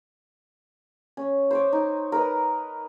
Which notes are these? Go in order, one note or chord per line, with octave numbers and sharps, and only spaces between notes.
C#4
C5 C#5 D6
D#4
A#4 B4 D#5